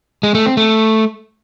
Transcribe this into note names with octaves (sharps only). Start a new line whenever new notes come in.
G#3
A3
C4
A3